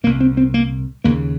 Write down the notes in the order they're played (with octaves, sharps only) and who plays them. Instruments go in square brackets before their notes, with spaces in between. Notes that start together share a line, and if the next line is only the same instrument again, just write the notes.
[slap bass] C2 A#2 A#3
C4
C4
A#3
D#2 C#3 A#3